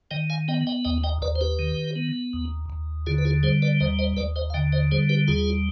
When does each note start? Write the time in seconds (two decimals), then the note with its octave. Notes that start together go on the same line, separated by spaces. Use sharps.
0.11 D#3 D#5 G5
0.30 F5 G#5
0.48 B3 D#5 G5
0.67 D#5 G5
0.85 D#2 D#5 G5
1.04 D#5 G5
1.22 D#2 B4 D5
1.36 C5
1.41 G4 B4
1.59 D#3
1.96 B3
2.33 D#2
2.70 D#2
3.06 D3 F4 G#4
3.18 B4
3.25 F4 G#4
3.43 G3 G#4 C5
3.62 B4 D5
3.80 D#2 C5 D#5
3.99 C5 D#5
4.17 D#2 B4 D5
4.36 C5 D#5
4.50 F5
4.54 D3 D#5 G5
4.73 C5 D#5
4.91 G3 G#4 C5
5.09 G4 B4
5.28 D#2 F4 G#4